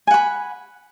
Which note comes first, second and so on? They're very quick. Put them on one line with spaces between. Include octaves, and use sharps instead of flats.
G#5 F#5 B5